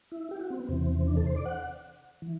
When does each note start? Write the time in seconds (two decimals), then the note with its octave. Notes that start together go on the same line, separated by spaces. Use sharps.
0.12 E4
0.31 G4
0.41 F#4
0.50 C4
0.60 B3
0.69 E2 C3 E3 C4
1.07 D4
1.17 A4
1.26 C5
1.36 D5
1.45 F#5
2.22 E3